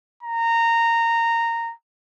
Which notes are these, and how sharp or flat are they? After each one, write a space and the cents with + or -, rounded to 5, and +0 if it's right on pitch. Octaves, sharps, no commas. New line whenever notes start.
A#5 -15